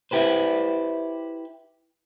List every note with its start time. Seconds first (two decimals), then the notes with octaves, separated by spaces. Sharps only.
0.11 E4 G4 B4 C5